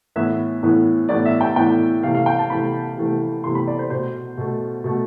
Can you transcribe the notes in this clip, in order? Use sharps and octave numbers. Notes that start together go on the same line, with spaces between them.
A2 E3 B3 E5
A2 E3 B3
A2 E3 B3 D5
E5
G5
A2 E3 B3 G5
C3 E3 A3 F5
F5
G5
A5
C3 E3 A3 B5
C3 E3 A3
C3 E3 A3 C6
B5
D5
C5
B2 A3 C5
B2 A3
B2 A3